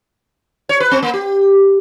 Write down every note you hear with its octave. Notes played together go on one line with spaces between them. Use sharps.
C#5
B4
C4
A#3
G4